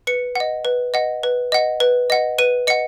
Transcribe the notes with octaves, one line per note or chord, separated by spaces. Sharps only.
B4 C#7
D#5 F#5
B4
D#5 F#5
B4
D#5 F#5
B4
D#5 F#5
B4 D#7
D#5 F#5 C#7